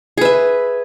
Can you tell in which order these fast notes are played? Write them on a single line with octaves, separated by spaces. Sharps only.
G#4 B4 E5